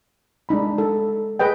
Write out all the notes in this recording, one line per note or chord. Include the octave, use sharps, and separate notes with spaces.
G#3 D4 D#4 B5
A4
G#4 B4 D#5 G5